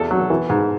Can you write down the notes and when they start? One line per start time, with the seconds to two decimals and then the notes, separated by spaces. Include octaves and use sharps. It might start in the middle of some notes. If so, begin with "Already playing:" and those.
Already playing: E2 A4
0.11 F#3
0.30 E3
0.49 G#2